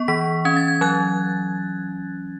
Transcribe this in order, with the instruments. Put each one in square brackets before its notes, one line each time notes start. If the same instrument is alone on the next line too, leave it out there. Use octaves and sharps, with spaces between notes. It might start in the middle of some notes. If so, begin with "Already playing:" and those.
Already playing: [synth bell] B3 C#6
E3 B6
C#4 G#6
A6
G#6
F#3 F#6